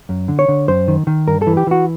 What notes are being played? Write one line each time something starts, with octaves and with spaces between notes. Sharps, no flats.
F#2
D3
C#5
D3
F#2 C5
D#3
D#3
G2 A#4
E3 A4
G4
E3 F#4